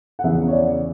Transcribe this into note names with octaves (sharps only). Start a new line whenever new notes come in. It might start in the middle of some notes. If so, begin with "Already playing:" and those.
F#5
E2 C#3 E3 E5
C#5
D5